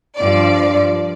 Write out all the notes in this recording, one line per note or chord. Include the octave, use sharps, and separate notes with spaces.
G2 F3 D5